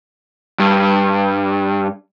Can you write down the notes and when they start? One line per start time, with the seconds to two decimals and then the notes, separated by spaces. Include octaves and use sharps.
0.59 G2